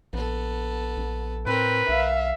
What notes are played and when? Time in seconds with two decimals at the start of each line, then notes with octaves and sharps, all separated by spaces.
0.13 A#1 B3 A4
0.97 A#1
1.47 A2 C4 A#4 B4
1.89 B1 E5 F5